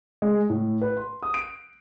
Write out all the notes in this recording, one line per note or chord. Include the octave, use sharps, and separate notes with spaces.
G#3
A2
B4
C6
D#6
D7